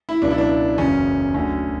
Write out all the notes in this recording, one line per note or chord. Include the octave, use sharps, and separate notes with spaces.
E4
C#2 B2 F#3 D4
E4
D4
F#1 E2 C#3 F#3 C#4
D2 D3 F#3 C#4